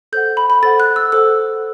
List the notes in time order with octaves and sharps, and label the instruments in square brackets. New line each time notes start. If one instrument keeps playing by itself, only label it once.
[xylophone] A4 C5 F#5 G6
B5
B5
A4 C5 F#5 A6
F#6
E6
A4 C5 F#5 E6